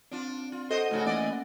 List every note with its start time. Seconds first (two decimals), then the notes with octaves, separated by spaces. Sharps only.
0.11 C4 D4 F4
0.52 F4
0.71 F#4 A4 C5 D#5
0.91 G#2 C#3 A3 F#4
1.05 E3 A#3 C#4 D5 D#5 F#6
1.18 F#5